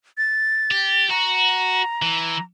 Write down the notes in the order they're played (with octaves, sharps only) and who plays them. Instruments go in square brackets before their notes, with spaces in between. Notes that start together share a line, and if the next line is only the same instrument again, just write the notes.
[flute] A6
[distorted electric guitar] G4
[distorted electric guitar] F#4 [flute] A#5
[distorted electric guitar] E3